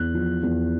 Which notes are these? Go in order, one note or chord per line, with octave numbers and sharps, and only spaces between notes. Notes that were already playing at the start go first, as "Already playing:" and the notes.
Already playing: E2 F#6
F3
E2